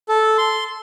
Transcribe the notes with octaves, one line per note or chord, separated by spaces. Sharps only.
A4
C6